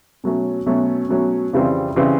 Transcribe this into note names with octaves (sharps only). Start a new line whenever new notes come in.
B2 F#3 A3 C#4
B2 F#3 A3 C#4
B2 F#3 A3 C#4
F2 C#3 E3 G3 C4
C#3 E3 G3 C4